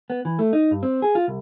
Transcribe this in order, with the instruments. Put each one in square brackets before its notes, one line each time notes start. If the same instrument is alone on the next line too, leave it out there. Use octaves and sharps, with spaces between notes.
[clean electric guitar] B3
E3
A3
D#4
G2
C4
G#4
F4
C2